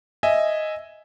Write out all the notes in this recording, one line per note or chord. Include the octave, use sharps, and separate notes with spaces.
D#5 E5 G#5